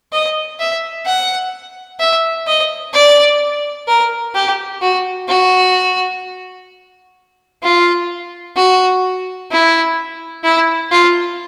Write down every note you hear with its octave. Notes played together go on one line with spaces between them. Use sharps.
D#5
E5
F#5
E5
D#5
D5
A#4
G4
F#4
F#4
F4
F#4
E4
E4
F4